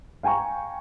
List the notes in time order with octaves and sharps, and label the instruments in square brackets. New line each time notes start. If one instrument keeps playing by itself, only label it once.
[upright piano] F5 G5 G#5 A#5 C#6